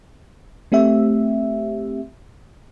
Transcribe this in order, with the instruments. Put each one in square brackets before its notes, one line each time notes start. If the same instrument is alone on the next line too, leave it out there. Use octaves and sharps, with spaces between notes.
[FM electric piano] A3 C4 G4 E5